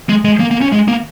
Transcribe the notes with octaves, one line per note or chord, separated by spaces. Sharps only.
G#3
G#3
A#3
A#3
C#4
G#3
A#3